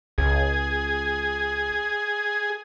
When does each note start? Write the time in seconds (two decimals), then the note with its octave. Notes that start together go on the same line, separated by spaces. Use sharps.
0.18 C#2 G#4